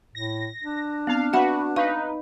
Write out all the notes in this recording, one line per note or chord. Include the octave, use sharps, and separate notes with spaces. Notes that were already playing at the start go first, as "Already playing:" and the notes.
A2 A#6
D4
B3 C4 F5
F#4 B4 E5 F#5 B5
D#4 B4 F5 C#6